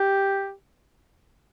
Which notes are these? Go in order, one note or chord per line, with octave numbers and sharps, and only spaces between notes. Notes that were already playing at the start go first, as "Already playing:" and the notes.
Already playing: G4